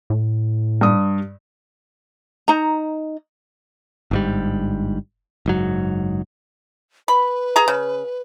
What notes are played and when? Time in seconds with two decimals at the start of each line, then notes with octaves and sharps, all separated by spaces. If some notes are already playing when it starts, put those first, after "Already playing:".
0.10 A2
0.81 G2 D#6
2.48 D#4 A#5
4.11 G1 G#2 G3
5.46 F#1 G#2 F#3
7.08 B4 B5
7.56 G#4 A#5
7.68 C#3